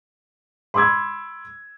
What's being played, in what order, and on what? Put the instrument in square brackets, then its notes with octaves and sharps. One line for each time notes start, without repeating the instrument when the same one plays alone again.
[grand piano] B5 C6 D6 E6 G#6